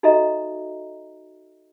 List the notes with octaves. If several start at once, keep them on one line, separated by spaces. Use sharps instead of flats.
D#4 F#4 A4 D#5 E5 A#5